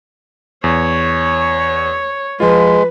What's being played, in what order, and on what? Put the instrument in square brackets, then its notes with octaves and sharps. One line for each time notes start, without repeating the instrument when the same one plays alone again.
[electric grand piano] E2 [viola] C#5
[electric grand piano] F3 F4 [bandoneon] G#3 [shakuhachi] B4